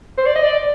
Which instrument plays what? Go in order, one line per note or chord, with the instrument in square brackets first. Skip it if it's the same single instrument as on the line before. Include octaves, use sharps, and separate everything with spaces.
[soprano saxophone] C5
D5
D#5
D5